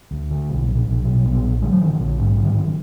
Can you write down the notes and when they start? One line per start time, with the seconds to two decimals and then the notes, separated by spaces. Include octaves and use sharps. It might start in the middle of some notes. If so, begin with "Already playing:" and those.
0.11 D2
0.31 D3
0.50 B1
0.68 A#2
0.86 B1
1.05 B2
1.25 A#1 B3
1.44 A#2
1.62 D3 G#3
1.71 F#3
1.81 F#1 D#3
1.91 D#3
1.99 A#1 D3
2.19 G#2
2.38 D3 D#3
2.56 F#1